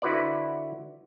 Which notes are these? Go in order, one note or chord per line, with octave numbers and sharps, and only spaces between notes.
D3 E4 F#4 B4 C5 D5